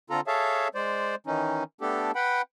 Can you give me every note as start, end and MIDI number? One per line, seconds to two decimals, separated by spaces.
0.10 0.21 50
0.10 0.21 60
0.10 0.21 65
0.10 0.21 69
0.10 0.21 82
0.27 0.68 68
0.27 0.68 69
0.27 0.68 73
0.27 0.68 76
0.27 0.68 77
0.27 0.68 81
0.75 1.15 56
0.75 1.15 72
0.75 1.15 74
1.27 1.64 51
1.27 1.64 52
1.27 1.64 61
1.27 1.64 63
1.81 2.11 57
1.81 2.11 59
1.81 2.11 62
1.81 2.11 67
1.81 2.11 69
2.15 2.42 71
2.15 2.42 78
2.15 2.42 79
2.15 2.42 83